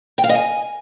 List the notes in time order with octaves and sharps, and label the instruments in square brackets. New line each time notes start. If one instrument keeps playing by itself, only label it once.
[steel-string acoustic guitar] G5
F5
D#5
G#5